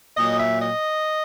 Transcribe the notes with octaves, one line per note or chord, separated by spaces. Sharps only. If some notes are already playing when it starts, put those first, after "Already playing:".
A#2 F#3 D#5
E5
D#5